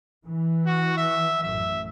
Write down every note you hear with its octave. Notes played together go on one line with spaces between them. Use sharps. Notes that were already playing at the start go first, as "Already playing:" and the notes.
E3
F#4
E5
A1 F#2 E5